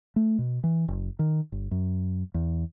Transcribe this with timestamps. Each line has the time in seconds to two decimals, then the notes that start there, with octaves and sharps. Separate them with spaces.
0.16 A3
0.39 B2
0.64 E3
0.88 F#1
1.19 D#3
1.52 G1
1.71 F#2
2.34 E2